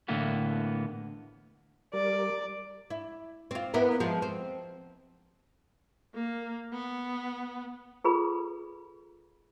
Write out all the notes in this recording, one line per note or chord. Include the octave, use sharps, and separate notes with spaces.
A2 D3 E3 A#3 B3
G3 A#4 D5
E4
C4 F4
B3 E4 A#4
F3 G#3
C4
A#3
B3
F4 G#4 A4 B4 B5